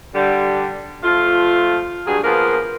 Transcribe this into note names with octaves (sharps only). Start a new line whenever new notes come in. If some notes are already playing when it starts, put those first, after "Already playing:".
D3 G3
F3 A3 F4
G2 F#3 G#4
F3 A#3 B3 G#4 A#4